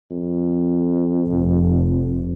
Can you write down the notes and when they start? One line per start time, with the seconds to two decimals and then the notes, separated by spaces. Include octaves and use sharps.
0.11 F2
1.28 F1